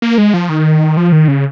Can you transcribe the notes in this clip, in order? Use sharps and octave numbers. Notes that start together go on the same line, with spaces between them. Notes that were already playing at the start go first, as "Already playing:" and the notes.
A#3
G#3
F3
D#3
F3
D#3
C#3